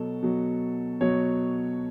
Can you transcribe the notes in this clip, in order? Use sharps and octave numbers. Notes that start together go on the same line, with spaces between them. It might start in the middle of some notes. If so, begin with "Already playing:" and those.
Already playing: B2 F#3 A4
B2 F#3
B2 F#3 C#5